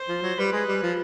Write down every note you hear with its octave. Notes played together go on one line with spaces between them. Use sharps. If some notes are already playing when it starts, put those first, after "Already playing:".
Already playing: C5
F3
F#3
G3 B4
G#3
G3
F3